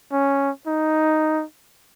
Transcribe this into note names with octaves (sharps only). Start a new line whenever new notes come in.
C#4
D#4